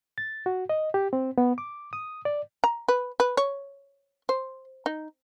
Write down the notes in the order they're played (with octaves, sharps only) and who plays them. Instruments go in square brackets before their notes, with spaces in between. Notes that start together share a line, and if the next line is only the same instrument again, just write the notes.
[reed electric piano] A6
F#4
D#5
G4
C4
B3
D6
D#6
D5
[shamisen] A#5
B4
B4
C#5
C5
D#4